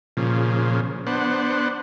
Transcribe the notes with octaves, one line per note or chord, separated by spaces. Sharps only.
A#2 C#3 F3
B3 D4 C5 F#5